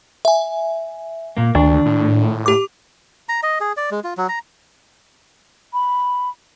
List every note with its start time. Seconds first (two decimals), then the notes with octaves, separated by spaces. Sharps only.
0.25 E5 G#5
1.37 A#2 A#3
1.55 D2 D#3 D4
1.86 A2
2.46 G4 D6
3.29 A#5
3.43 D#5
3.60 G#4
3.77 D5
3.91 G#3
4.04 F4
4.17 F#3
4.29 A#5
5.73 B5